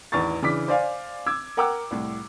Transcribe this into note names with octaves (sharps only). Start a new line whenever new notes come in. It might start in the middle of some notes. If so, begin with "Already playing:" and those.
A1 E2 D#3 C#6 A6
C#3 E3 D4 D6 B6
C5 D5 F5 G#5
D6 E6 G#6
A#4 F#5 G5 A#5 D6 E6
C2 A2